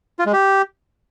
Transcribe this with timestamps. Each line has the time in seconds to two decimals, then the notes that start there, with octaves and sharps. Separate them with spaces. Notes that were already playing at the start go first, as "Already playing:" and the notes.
0.19 F4
0.26 G#3
0.33 G4